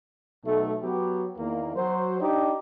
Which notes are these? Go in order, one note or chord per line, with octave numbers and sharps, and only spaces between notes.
B1 A3
F#3 B3 G4
E2 D#3 A#3
F#3 C5
D4 D#4 G4